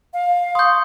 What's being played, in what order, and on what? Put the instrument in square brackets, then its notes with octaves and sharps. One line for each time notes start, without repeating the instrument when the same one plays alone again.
[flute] F5
[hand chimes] C6 C#6 [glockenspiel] D#6 G6